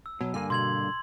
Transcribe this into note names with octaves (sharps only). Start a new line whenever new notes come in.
E6
B2 F#3
G2 D3 A#3 G#5
B2 C6 G#6 F#7